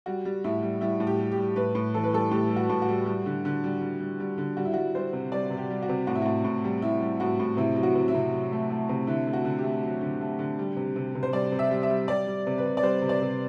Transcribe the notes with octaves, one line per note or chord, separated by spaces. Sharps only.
G3 F#4
G3
A2 E4
G3
G3 E4
A2
G4
G3
G4
G3
A2 B4
A2
E3 A4
B4
G3 A4
A2 G4
G3
F#4
A2
F#4
G3
G3
D3
D3
G3
G3
G3
G3
D3
G3 F#4
E4
G3 F#4
G3 C5
C3
G3 D5
C3
G4
G3
F#4
C3
A2 F#4
E4
A2 F#4
A2
G3
G3 E4
G3
A2 F#4
A2
C3 E4
F#3
F#4
C3
E4
C3
F#3
A3
A3
C3
D3 E4
A3
F#4
D3
G4
A3
F#3
D3
A3
D3
G3
C3
C3
C3
C5
G3 D5
C3
E5
G3
E5
G3
G3 D5
G3
C3
B4
C3
D5
G3 C5
C3
D5
C3